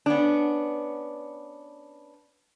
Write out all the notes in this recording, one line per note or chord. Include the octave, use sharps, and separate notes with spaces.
B3 C#4 D4